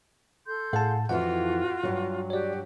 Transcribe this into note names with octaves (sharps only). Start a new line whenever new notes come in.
A4 C6 G6
A2 G#4 F5 F#5 A5
F2 E3 F4 F#4 F#5
G2 F#3
F#4 G4 C#5 D5